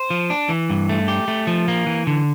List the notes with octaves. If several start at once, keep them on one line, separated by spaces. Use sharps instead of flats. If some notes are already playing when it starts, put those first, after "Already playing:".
Already playing: C5
F3
D4
E3
G2
A3
G4
A3
F3
A#3
E3
D3